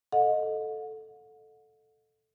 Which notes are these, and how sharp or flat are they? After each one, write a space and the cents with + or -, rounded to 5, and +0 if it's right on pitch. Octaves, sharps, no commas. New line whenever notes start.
A4 -5 D#5 +0 F#5 -40